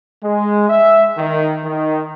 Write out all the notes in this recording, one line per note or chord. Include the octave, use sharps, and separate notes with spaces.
G#3
E5
D#3
D#3